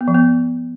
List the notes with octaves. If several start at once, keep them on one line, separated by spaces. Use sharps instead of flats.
B3
F3
B3